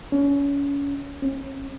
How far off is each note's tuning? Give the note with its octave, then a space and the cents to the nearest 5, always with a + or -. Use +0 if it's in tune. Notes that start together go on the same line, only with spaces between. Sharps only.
C#4 +30
C#4 -35